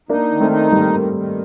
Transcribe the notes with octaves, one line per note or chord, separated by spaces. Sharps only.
A#3 D4 D#4
D#3
A3 C4
D#4
D#3 G3 A#3
D#3
D#3